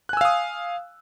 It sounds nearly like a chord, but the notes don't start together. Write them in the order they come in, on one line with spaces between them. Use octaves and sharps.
F#6 G#5 E6 F5 D#6